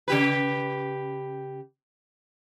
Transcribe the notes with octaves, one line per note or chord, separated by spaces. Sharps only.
C#3 G4 B4